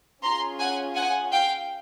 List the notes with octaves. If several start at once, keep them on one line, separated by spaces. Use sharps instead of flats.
C#4 F4 G#4 A#5 C6
F#5 G#5
F#5 G#5
F5 G5